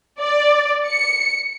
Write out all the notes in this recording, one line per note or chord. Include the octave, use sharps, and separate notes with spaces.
D5
C#7